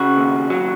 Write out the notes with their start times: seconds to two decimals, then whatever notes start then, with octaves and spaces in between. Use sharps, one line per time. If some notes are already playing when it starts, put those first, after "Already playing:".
Already playing: C#3 F#4
0.17 D#2
0.50 F#3